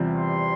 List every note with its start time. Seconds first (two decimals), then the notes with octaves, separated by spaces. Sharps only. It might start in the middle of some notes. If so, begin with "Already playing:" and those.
Already playing: E2 C3 G3 C4 F4
0.16 C6